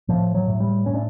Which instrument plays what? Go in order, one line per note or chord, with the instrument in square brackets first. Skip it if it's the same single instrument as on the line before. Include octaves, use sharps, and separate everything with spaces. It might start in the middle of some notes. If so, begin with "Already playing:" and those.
[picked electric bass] A2 F3
F#3
A2
G3
A2 C#4
D4